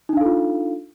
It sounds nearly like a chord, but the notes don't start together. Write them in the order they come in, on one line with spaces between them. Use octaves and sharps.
D#4 D4 F5 A4 F4